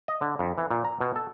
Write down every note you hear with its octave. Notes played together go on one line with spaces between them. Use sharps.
D#5
D3
F2
E3
A#2
A#5
B2
A4